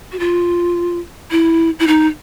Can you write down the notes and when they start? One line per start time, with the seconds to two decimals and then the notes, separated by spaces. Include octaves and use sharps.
0.12 F#4
0.19 F4
1.31 E4
1.79 E4
1.87 D#4